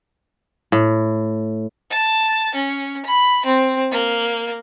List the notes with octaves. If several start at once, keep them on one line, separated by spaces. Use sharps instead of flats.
A2
A5
C#4
B5
C4
A#3